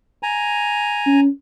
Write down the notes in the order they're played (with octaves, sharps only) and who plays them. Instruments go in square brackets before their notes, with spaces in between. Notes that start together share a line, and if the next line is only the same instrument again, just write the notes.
[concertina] G#5 A#5
[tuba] C#4